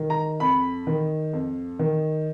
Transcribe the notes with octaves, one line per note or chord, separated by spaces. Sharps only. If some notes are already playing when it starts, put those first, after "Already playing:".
Already playing: D#3
A#5
F2 B5
D#3
F2
D#3